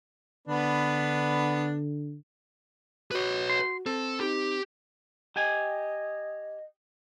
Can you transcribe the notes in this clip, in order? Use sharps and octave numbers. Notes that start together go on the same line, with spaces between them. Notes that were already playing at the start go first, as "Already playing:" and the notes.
D3 B3 D4 B4
F#4 B4 C#5
C6
C4 A4
D#4 G4
G4 D#5 G5 G#5